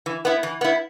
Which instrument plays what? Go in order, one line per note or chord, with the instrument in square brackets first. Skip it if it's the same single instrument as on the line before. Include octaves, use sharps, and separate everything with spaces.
[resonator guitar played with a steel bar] E3
B3 E4
E3
B3 E4